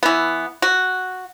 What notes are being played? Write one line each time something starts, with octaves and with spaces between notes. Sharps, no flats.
E3 B3
F#4